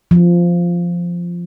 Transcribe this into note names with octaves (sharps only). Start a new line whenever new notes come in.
F3